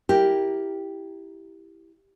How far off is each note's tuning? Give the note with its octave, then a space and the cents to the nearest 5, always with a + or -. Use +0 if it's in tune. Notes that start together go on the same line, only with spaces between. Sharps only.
E4 +0 G4 +0 A#4 +0